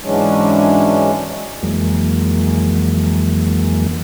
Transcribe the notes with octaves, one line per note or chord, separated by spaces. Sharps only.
G#2 E3 F#3 G#3 C#4 D4
F2 E3 F#3 G#3 A#3